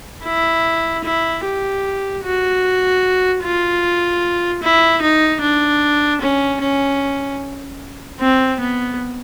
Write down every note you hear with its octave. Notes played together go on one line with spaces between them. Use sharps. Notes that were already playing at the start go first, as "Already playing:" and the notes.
E4
E4
G4
F#4
F4
E4
D#4
D4
C#4
C#4
C4
B3